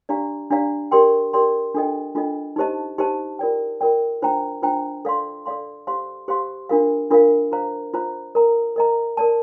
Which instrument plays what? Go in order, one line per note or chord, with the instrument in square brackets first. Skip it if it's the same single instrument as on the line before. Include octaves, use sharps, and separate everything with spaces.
[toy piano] D4 G4 D5 F5 A#5
D4 G4 D5 F5 A#5
G4 A#4 D5 G5 C6
G4 A#4 D5 G5 C6
D4 F4 A4 D#5 G5
D4 F4 A4 D#5 G5
D#4 G4 C5 D#5 A5
D#4 G4 C5 D#5 A5
F4 A#4 D5 G5
F4 A#4 D5 G5
D4 F4 C5 G5 A#5
D4 F4 C5 G5 A#5
A4 D5 F5 C6
A4 D5 F5 C6
G4 C5 F5 C6
G4 C5 F5 C6
D4 F4 A#4 F5
D4 F4 A#4 F5
F4 C5 F5 A#5
F4 C5 F5 A#5
A#4 D#5 A#5
A#4 D#5 A#5
A#4 D5 A5